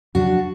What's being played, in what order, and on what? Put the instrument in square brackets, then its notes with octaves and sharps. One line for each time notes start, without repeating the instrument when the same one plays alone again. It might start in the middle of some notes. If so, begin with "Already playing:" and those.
[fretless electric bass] F2 C#3 F#3 [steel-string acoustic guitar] D4 F#4